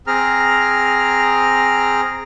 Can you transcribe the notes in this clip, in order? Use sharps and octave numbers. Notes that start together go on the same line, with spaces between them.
C4 G#4 A#5 F6